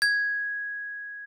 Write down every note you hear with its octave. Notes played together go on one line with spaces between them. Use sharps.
G#6